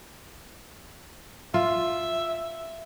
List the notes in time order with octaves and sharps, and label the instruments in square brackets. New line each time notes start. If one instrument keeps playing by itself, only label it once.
[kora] F4 [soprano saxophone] E5